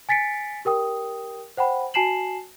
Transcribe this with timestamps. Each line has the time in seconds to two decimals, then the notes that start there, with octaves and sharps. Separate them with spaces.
0.09 G#5 A6 B6 C#7 D7
0.65 G4 A#4 G5 D#6
1.57 C5 F#5 G5 B5
1.94 F#4 G#5 A5 C7 E7 F#7